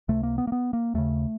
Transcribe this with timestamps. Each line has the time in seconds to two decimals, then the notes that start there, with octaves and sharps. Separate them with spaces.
0.08 C#2 C3 A3
0.23 A#3
0.38 B3
0.47 A#3
0.52 B3
0.73 A#3
0.94 D#2 C#3 A3